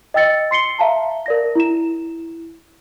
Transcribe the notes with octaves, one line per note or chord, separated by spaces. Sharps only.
D#5 G5 E6 A6 C#7
C6 C7 C#7 G7
E5 F5 A5 A#5
A#4 D5 A#6
E4 E7